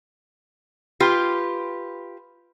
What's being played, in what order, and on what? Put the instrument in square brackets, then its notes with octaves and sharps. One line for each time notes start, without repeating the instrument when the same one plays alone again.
[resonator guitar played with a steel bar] F4 G4 B4